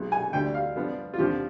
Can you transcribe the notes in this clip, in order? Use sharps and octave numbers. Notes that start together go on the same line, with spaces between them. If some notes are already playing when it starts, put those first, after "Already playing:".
Already playing: B1 B2 G#3
G#5
D2 D3 G3 G5
F5
G2 F3 B3 D4
F4
D#2 D3 F3 C4 G4